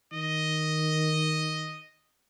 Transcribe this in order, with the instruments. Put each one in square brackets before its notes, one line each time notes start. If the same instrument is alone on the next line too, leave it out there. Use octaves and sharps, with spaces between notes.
[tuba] D#3 [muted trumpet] D#5